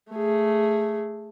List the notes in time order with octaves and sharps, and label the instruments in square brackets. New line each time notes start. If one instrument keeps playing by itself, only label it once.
[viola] A3 G#4